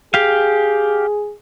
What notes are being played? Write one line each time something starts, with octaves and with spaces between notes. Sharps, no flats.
G4 G#4 F5